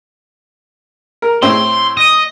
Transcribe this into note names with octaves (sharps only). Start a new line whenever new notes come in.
A#4
A2 C4 C6
D#5